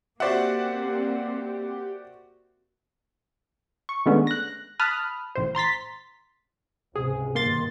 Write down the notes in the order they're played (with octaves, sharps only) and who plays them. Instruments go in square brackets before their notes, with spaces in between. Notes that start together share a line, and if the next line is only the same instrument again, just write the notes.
[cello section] A#3 C4 [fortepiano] F#4 C5 E5 [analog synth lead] G4 [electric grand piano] D5 F#5
[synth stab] C#6
D#3 G#3 A3 B3 C#4 D4
F#6 A#6
A5 B5 D#6 F6 F#6
A1 A2 C5
A#5 C6 A6 B6
[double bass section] C#2 G#2 C3 [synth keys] G#4
[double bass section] G2 B2 D#3 [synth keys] A#3 C6 A6